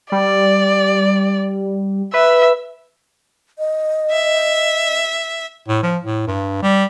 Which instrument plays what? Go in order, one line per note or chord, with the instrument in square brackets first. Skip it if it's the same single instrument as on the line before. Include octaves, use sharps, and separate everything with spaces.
[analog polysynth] G3 [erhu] D5
[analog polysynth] B4 [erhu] E5
[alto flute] D#5
[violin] E5
[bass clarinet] A2
F3
A2
G2
G3